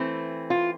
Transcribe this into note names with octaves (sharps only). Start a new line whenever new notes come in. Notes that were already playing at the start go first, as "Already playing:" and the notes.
Already playing: E3 A3 C4
F4